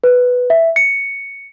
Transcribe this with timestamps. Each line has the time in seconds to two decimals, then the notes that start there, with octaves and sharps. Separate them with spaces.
0.04 B4
0.50 E5
0.76 C#7